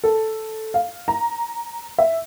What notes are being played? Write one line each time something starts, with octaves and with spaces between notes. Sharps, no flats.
A4
F5
A#5
E5